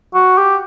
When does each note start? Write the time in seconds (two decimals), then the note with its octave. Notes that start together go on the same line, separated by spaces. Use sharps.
0.15 F#4
0.38 G4